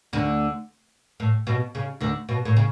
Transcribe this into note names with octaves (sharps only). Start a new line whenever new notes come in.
D2 D3
A2
B2
C#3
D2 D3
B2
A2
C#3